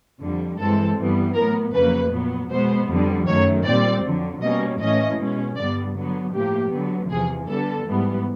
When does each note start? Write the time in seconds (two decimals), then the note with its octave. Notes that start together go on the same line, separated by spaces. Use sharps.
0.20 F2 D3 G3
0.58 G2 E3 G#3 C4 A4
0.97 G2 E3 G3 B3
1.35 A2 F#3 B3 A#4
1.74 F2 C#3 F#3 A#3 B4
2.12 A#2 F#3 B3
2.50 B2 G#3 B3 C5
2.88 F2 D3 G3 B3
3.27 F#2 D#3 F#3 A3 C#5
3.65 A#2 G3 C4 D5
4.04 F2 D3 F#3
4.42 B2 G3 A#3 C#4 D#5
4.80 A2 E3 A3 C#4 D#5
5.19 B2 G#3 C#4
5.57 G2 D3 G3 B3 D5
5.95 D3 F#3 B3
6.33 A2 F3 A#3 G4
6.72 D3 F#3 B3
7.10 E2 C3 F3 G#4
7.49 D3 G3 B3 A4
7.87 G#2 E3 G3 B3